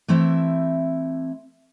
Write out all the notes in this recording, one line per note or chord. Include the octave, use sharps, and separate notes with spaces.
E3 A3 C4 E4 E5